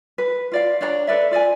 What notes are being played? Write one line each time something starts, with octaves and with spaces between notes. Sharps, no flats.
B4
F4 D5 F5
D4 C#5 D5 A#5
A4 B4 D5 E5
F4 D5 D#5 G#5